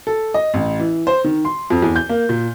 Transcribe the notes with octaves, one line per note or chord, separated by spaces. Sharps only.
A4
D#5
A1
E3
C5
D#3
C6
F2
E2
G6
A#3
A#2